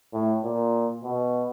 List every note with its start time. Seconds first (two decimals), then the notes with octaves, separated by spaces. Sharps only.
0.13 A2
0.44 A#2
1.04 B2